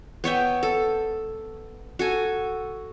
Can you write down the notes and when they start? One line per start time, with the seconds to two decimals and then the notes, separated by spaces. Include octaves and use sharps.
0.24 B3 C#5 E5 G5
0.63 A4
1.99 F#4 A4 G#5